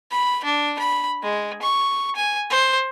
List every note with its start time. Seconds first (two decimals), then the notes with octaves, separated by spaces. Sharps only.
0.11 B5
0.44 D4
0.79 B5
1.22 G#3
1.62 C#6
2.16 G#5
2.50 C5